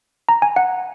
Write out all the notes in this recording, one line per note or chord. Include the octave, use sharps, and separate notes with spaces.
A#5
G#5
F#5